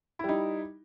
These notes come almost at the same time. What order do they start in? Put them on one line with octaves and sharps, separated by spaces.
E4 G3 D#4